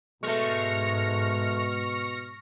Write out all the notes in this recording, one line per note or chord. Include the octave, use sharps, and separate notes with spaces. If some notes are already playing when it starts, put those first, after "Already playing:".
G#2 B2 G#3 A3 C#6 F6 A#6